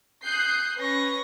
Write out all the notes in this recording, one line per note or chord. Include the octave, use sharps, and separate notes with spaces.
D#6 F#6 G6 C7
C#4 B4 C#6 A#6